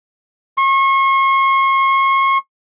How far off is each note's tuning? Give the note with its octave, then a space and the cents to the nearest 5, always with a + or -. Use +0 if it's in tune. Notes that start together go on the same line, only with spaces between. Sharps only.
C#6 -40